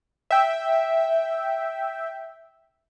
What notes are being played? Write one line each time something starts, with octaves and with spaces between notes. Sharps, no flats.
E5 G5